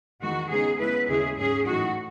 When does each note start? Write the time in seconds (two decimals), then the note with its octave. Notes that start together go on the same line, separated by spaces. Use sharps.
0.22 E2 D#3 G#3 F#4
0.50 C#3 G#3 B3 D#4 G#4
0.80 C#3 G#3 B3 E4 B4
1.08 D#2 C#3 G#3 C#4 E4 G#4
1.38 G#2 F#3 C#4 G#4
1.66 A2 E3 A3 D#4 F#4